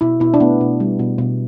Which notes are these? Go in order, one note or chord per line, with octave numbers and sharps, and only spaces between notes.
B2 E4
B2 E4
D4
A3 B3
B2
G3
B2
B2